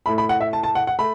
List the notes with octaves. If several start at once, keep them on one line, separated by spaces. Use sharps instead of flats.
A2 A3 B5
B5
F#5
E5
A5
A5
F#5
F#5
A3 B5